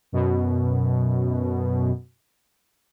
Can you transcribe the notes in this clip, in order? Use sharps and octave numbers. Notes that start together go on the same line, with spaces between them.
F#2 B2